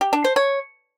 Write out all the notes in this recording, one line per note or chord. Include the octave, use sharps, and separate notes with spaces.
G4
D4
C5
C#5